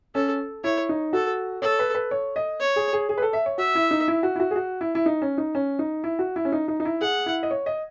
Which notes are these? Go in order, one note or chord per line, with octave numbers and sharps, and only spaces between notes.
C#4 A4
E4 C#5
D#4
F#4 A4
A4 C#5
B4
B4
C#5
D#5
C#5
G#4
G#4
G#4
B4
A4
E5
C#5
F#4 E5
E4
D#4
E4
F#4
E4
F#4
G#4
F#4
E4
E4
D#4
C#4
D#4
C#4
D#4
E4
F#4
E4
C#4
D#4
D#4
D#4
E4
G#4 F#5
E4
D#5
C#5
D#5